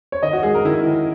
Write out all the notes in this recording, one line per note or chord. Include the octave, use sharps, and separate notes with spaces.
C#5
D#3 D#5
F#4
G#3 G#4
A#4
D#3 E4
D#3